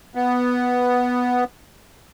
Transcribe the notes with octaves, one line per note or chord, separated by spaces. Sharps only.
B3